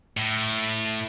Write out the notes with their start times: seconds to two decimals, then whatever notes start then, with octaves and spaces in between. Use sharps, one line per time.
0.17 A2